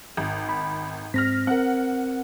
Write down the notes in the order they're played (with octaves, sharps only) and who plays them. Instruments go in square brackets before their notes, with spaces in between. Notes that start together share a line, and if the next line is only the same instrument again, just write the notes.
[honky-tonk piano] G#1
[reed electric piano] B5
[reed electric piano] G#2 C4 [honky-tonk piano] F6 A#6 B6
[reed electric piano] C4 A#4 [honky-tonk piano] F#5